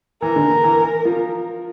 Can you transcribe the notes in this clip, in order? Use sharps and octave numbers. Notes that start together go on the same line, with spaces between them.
E3 A#4
D3
E3
F3